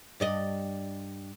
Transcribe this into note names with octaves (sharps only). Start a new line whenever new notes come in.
G2 D5 D#5